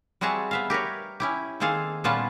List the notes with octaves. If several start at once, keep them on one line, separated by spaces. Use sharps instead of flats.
G3 C4 F#4 G#4 E5 A5
B3 E5 F5
G4 A#4 B4 C#5
C#4 E4 G4
D#3 A#3 C4 G#4 A4 F5
A#2 G3 B3 C#4 F4 A5